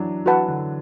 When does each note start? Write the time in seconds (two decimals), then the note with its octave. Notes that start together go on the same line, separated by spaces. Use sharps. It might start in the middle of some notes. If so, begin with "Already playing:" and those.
Already playing: E3 F#3 D4
0.26 E3 F#4 B4 F#5 A5
0.48 D3